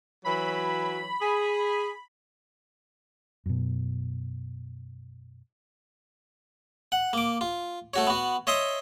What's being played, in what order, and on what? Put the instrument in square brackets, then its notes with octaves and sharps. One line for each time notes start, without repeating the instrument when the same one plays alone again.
[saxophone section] E3 F#3 [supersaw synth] B5
[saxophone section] G#4
[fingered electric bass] F#2 B2
[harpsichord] F#5
A#3 D6
F4
A3 F#4 C#5
B3 F#4
C#5 D#5 E5 C6 D#6